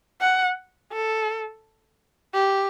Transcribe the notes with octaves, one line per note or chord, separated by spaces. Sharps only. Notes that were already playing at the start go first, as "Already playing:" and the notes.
F#5
A4
G4